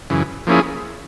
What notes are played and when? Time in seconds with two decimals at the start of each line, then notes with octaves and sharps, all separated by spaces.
0.10 F#2 C#3 E3
0.47 F3 A#3 C#4 E4 G#4